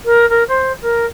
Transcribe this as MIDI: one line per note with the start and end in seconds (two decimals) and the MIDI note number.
0.04 0.28 70
0.29 0.43 70
0.48 0.72 72
0.81 1.05 70